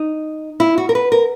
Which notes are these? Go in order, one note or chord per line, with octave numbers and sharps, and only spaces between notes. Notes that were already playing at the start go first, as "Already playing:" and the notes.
Already playing: D#4
E4
F#4
A#4
B4
A#4